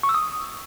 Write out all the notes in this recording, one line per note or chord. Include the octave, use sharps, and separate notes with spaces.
C#6
E6
D#6